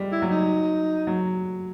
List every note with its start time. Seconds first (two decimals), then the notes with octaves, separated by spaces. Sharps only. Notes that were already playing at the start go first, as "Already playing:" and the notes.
Already playing: G3 G#3
0.12 E4
0.22 F#3
0.31 D#4
1.07 F#3